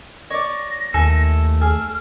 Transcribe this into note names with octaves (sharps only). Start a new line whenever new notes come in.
C#5 D5 A#6
D#2 A3 A4 G#5
G#4 F6